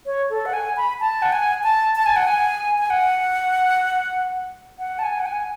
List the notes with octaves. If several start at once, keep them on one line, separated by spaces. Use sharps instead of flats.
C#5
A4
F#5
G#5
B5
A5
F#5
G#5
A5
A5
G#5
F#5
G#5
G#5
F#5
F#5
A5
G#5
F#5
G#5